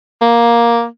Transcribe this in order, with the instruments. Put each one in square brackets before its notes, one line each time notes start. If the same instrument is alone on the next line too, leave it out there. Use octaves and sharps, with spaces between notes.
[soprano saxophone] A#3